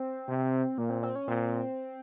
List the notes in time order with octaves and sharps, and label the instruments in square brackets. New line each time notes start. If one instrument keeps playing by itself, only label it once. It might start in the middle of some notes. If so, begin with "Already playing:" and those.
Already playing: [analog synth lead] C4
[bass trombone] C3
[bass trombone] A#2 [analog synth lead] A#3
[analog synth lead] C4
C4
C#4
[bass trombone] A#2 [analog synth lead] C4